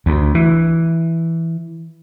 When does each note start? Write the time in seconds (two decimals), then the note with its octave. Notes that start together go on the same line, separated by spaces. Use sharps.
0.06 D2
0.35 E3